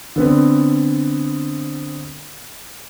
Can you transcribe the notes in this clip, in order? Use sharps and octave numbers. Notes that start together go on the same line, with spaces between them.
D3 B3 C4